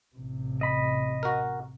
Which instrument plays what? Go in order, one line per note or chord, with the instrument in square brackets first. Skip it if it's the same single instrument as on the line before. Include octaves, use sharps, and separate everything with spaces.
[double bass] A1 C3
[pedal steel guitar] D#5 B5
[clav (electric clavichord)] F#4 A#4